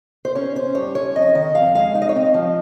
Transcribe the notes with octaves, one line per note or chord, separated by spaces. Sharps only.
C5
C#4 C#5
C#4 C5
G2 C#5
C#4 C#5
F2 D#5
D#3 D#5
F2 F5
G#3 F5
D#4 F5
D#5
C#5
C4 D#5
F3